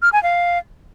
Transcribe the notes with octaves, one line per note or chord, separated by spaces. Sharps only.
F6
G#5
F5